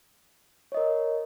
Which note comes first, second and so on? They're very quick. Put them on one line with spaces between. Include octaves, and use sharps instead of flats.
C#5 D#5 A#4